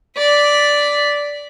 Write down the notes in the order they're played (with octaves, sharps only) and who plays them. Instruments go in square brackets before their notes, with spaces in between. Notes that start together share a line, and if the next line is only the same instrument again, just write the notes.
[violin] D5 B6